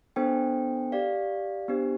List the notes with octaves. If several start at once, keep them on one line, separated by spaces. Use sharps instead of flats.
B3 D4 A4 C5 G5
G4 D5 F5
B3 D4 G4 C5